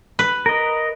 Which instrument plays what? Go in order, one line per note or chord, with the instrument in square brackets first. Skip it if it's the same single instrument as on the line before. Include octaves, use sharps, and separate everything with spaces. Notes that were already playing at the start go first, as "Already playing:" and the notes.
[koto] B4
[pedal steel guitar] A#4 D#5